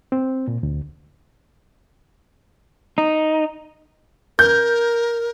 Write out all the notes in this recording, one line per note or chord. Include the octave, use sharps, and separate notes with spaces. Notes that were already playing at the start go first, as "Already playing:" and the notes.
C4
A#2
D2
D#4
A#4 G6